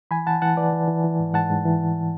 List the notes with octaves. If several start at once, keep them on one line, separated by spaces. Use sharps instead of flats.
E3 G#5 B5
E3 F#5 A5
E3 F#5 A5
E3 B4 D5
E3
E3
E3
G#2
G#2 F#5 A5
G#2
E3
G#2